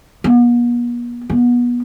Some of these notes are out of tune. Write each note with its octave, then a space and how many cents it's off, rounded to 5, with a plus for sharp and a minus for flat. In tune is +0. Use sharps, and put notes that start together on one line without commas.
B3 -45
B3 -25